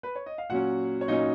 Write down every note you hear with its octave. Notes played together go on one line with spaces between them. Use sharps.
B4
C#5
D#5
F5
A#2 F#3 C#4 F#4 F#5
C#5
A#2 F#3 C#4 D#4 D#5